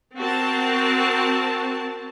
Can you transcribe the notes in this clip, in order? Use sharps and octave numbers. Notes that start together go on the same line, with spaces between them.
C4 F#4 A#4 A5